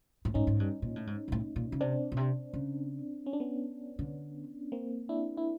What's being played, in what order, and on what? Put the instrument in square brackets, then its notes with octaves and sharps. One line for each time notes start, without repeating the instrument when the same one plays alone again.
[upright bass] A2
[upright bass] G#2 [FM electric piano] C#4 D#4
[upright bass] G#2
G2
A#2
A2
G#2
A#2
A2
A#2
C#3
[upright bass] C3 [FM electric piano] C4 D4
[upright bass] B2
C3
C#3
[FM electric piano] C#4
D4
B3 C#4
[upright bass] D3
[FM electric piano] A#3 C4
D4 E4
E4